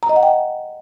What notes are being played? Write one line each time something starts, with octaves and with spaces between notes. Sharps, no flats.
A#5
D#5
F#5
G5